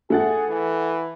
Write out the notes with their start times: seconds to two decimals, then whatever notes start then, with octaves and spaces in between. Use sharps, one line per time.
0.10 A3 G#4 F#5 A6
0.48 E3